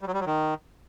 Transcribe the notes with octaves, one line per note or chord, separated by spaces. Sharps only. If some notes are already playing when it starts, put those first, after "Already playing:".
G3
F#3
G3
F#3
D#3